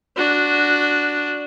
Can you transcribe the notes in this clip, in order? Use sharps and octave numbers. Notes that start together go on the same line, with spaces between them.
D4 F#4